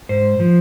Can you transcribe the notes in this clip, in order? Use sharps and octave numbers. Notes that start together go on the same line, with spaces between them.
G#2 C5
F3